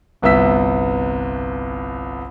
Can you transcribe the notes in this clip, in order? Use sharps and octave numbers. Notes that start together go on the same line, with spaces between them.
G1 C2 B3 E5 E6 B6